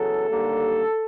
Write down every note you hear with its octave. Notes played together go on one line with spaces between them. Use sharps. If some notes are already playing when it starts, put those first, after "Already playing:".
Already playing: E2 C#3 F#3 A4
D#2 D3 G3 A#3